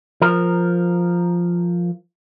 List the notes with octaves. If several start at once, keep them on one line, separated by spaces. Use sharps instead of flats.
F3 A#4